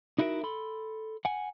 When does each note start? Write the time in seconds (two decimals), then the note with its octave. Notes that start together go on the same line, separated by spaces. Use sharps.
0.18 D#4 E4 F#4 G4 A#4 E5
0.43 A4 B5 C6
1.25 F#5 G#5